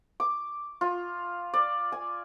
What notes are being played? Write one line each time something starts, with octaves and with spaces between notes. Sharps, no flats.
D6
F4
D5
G#5